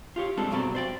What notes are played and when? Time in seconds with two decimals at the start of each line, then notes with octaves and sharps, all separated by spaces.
0.16 F4 G4 C#5
0.37 G3 G#3 C4 D4 A4
0.51 G2 B2 F#3 C4 D5 C6
0.75 C5 D5 G5